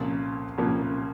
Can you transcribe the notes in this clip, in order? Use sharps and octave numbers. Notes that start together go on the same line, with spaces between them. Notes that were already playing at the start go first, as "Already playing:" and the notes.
Already playing: C2 A#2 F3 A#3 C#4
C2 A#2 F3 A#3 C#4